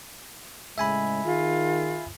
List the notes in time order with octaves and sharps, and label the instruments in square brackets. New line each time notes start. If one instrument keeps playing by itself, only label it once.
[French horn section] A2 C#3 G#3 [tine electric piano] E5 G#5 B5
[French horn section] D#3 G#4 [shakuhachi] F4